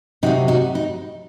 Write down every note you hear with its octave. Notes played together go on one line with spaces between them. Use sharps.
C3 F#3 D#4 F#4
D#4 F#4
D#4